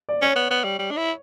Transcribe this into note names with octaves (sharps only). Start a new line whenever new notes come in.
D5
C#4 C#5
B3
B3
G3
G3
D4
E4